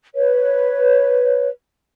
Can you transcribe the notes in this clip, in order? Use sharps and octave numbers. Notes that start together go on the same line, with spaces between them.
B4 C#5